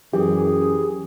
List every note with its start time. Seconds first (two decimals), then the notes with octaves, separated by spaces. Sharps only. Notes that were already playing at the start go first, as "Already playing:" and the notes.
0.13 F#2 E3 G4 G#4